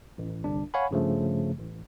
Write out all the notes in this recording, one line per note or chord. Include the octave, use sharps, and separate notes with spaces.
A1
G1 C2 D4
C#5 F5 F#5 G#5 B5
G2 C#3 F3 A3
A1